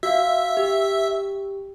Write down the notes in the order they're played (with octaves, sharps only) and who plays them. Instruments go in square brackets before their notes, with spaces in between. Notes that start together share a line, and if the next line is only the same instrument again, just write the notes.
[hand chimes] F#4 F5 [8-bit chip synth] E5
[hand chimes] G4